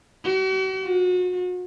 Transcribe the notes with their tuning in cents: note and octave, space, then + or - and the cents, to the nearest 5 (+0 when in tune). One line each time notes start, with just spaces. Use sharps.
F#4 +45
F#4 -35